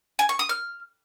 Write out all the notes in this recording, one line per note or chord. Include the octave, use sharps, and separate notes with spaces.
G#5
C#6
D#6
F6